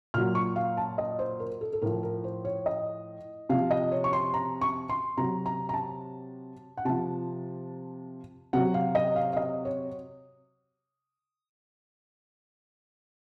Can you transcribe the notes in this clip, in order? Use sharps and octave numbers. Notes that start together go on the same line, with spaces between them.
A#2 F#3 F6
C#6
F5
A5
D#5
C5
A#4
A4
A4
A2 F3 A#4
A#4
C5
C#5
D#5
C3 F3 F5
D#5
C#5
C#6
C6
A#5
C#6
C6
C3 F#3 A#5
A#5
A#5
A5
F#5
C3 F3 A5
C3 F#3 F#5
F5
D#5
F5
F5
D#5
C#5